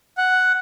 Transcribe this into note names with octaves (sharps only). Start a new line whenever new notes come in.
F#5